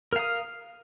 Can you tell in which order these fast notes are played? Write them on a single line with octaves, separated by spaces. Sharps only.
A#4 F5 D#6